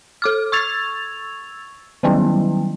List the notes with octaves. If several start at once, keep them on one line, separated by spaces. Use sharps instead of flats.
A4 D6 F6
C#6 E6 G#6 A6 F7
D#3 F#3 G3 B3 C#4 E4